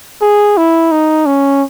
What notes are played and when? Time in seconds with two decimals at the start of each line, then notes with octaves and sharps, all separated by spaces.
0.22 G#4
0.57 E4
0.92 D#4
1.26 C#4